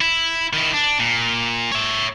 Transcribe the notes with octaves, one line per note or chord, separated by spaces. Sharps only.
E4
D#3 E4
D4
A#2
C#5 E5